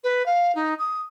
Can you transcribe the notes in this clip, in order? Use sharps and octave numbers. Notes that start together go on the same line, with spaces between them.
B4
F5
D#4
D#6